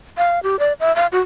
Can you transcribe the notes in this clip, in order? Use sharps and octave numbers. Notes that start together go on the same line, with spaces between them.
F5
G4
D5
E5
F5
F#4